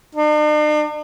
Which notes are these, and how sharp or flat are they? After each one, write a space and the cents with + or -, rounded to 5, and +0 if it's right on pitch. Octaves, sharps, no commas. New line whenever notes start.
D4 +45